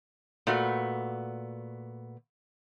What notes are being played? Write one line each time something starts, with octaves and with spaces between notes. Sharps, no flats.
A#2 A3 B3 F#4